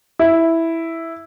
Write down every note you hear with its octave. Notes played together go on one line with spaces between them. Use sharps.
E4